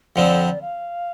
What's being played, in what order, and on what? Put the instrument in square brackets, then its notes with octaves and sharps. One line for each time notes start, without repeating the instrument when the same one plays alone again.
[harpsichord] F2 D3 F3 C4 [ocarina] D5
[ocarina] F5